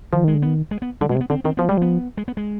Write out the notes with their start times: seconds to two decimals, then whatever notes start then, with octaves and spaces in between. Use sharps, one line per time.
0.13 D#3 F3
0.24 D#3 G#3
0.35 D3
0.42 D#3 B3
0.71 G#3
0.82 B3
1.01 D3 G3
1.09 B2 G#3
1.15 C3
1.21 B3
1.30 D3 C4
1.44 D#3 C4
1.57 F3 B3
1.69 G3 G#3
1.77 F3 B3
2.17 G#3
2.28 B3
2.37 G#3